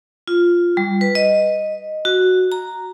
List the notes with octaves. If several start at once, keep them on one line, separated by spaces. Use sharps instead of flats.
F4
G3
B4
D#5
F#4
A#5